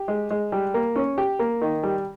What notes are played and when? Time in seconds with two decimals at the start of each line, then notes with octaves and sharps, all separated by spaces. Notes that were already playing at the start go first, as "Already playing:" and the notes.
Already playing: G4
0.08 G#3
0.30 G#3
0.52 G3
0.74 A#3
0.96 C#4
1.18 G4
1.39 A#3
1.61 D#3
1.83 G3